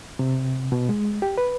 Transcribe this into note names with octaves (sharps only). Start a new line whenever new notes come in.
C3
B2
G#3
G4
B4